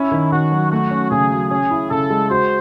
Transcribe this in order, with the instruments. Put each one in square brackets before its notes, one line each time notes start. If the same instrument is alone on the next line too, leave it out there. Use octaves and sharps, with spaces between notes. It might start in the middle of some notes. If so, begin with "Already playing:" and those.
Already playing: [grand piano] C#4 [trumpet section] E4
[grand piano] D#3
[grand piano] D#3 [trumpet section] F#4
[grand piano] F#3
[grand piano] A3 [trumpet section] F#4
[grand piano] C#4
[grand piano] C#3 [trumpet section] G#4
[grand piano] F#3
[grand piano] C#4 [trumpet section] G#4
[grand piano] E4
[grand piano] C#3 [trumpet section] A4
[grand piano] G#3
[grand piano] F#4 [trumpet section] C5